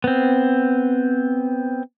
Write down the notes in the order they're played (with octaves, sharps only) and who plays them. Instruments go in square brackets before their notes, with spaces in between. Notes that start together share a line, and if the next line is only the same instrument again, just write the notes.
[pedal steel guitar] B3 C4